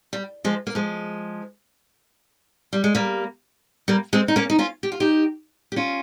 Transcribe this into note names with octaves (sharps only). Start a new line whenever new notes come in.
G3
F3 G#3
A#3
F3 G#3
G3
G#3
G3 A#3
G3 A#3
G#3 C4
D#4
A#3 C#4
D#4
C#4 F4
G4
F4
D#4 G4
G4
C#4 F4